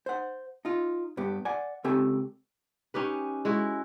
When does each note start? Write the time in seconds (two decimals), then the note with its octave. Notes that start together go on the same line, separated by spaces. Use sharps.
0.06 C5 F#5
0.65 D#4 F4
1.17 G2 B3 G4
1.45 D5 F#5 G#5
1.84 C#2 C4 G4 A4 G5 G#5
2.94 C#4 D#4 G4 B4
3.45 G#3 E4 F#4